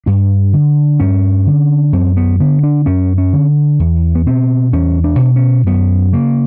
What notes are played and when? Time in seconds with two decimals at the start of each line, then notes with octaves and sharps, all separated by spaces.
0.06 G2 D4
0.53 D3
0.99 G2 C#4
1.46 D3
1.93 F#2 C4
2.17 B3
2.40 D3 B3
2.63 D4
2.86 F#2 C#4
3.18 C#4
3.33 D3
3.79 E2
4.15 B3
4.26 B2 C4
4.73 E2 C#4
5.04 D4
5.19 B2
5.36 C#4
5.67 F#2 B3
6.13 C#3 A#3